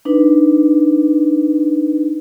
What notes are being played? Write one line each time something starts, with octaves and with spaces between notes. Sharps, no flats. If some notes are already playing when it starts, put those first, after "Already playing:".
D4 D#4 B4